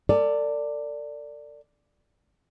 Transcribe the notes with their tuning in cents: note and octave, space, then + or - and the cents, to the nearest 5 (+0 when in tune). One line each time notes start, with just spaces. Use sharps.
A4 +45 D5 +0 G#5 +0